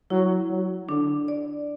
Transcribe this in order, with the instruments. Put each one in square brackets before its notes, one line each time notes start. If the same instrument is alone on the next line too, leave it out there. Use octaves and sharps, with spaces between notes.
[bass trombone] F#3 [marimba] E4
[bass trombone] F#3
[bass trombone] D3 [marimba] D4
[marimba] D5